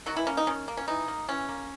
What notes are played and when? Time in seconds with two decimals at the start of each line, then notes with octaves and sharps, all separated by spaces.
0.06 D#3 F#3 F#4
0.17 E3 E4
0.27 A#3 C#4
0.37 D#4
0.47 D#3 C#4
0.68 A#3
0.77 C#4
0.88 E3 D#4
1.08 A#3
1.28 E3 C#4
1.49 A#3